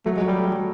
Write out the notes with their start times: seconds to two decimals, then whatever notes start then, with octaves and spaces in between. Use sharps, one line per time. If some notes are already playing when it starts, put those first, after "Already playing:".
0.06 F#3 A3
0.16 G#3
0.21 F#3
0.26 G3
0.37 A3
0.52 F#3